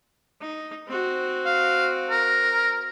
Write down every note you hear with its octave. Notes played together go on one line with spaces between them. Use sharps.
D#4
C4 F#4
F5
A#4